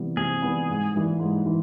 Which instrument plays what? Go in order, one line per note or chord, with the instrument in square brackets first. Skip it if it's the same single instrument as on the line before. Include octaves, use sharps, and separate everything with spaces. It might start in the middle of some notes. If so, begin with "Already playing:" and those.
Already playing: [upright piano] C3 E3 G3 B3
[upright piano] C3 [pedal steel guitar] G#4
[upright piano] E3 G3 B3
G#2
E3 G3 A#3
G#2
E3